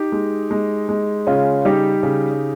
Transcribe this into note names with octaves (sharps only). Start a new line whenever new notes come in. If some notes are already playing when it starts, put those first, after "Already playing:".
Already playing: D#4 G4
G#3
G#3
G#3
C#3 C#4 F4
G3 D#4 G4
C#3